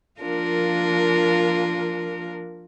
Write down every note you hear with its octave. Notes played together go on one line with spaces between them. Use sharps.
F3 A#3 D4 F4 A#4